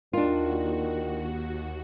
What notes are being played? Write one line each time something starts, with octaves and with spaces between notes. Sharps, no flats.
D#2 D#3 D4 F4 F#4